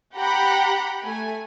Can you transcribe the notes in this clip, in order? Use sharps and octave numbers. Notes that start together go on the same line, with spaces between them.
G4 F#5 G5 A#5 B5 F#6
A3 G#5